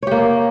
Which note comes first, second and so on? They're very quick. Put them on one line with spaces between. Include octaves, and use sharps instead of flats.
C#5 G4 A#3